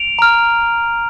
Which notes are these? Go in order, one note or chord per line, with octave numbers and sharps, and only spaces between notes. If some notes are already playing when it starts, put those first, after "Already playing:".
Already playing: D7 F7
A#5 F6